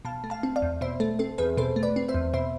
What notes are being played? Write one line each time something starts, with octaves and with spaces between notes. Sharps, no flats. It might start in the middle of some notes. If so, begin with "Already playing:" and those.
B2 F5 A5
A3
F5 A5
C4
D5 F5
E2
B2 C5 E5
A3 A4
C4 A4
E2 G#4 B4
B2 A4 C5
A3
B4 D5
C4
C5 E5
E2
B2 C5 E5